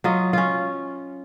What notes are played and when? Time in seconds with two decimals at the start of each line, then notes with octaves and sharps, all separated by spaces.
0.04 F#3 F4 D#5
0.33 C#4 F4